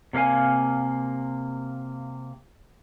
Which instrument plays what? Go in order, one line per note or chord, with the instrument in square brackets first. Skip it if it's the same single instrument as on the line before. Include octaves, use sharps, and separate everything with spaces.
[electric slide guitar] C3 A#3 C#4 F5 G#5